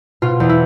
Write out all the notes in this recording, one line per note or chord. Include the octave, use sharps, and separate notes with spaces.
B2 F4
E2
E4